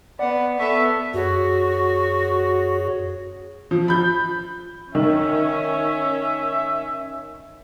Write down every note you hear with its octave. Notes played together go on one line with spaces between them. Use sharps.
B3 D5 F#5
B3 A4 E5 C#6
F#2 F#4 G#4 C#5
F3
B5 G6
D#3 C#4 E5